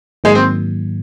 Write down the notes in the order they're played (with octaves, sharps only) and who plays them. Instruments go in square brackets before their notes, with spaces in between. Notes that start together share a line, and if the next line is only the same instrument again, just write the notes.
[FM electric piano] G#2 D#3 F#3 A#3 [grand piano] G#3
[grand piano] C4